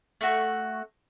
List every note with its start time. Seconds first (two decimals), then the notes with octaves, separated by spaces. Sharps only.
0.21 A3 F#4 C#6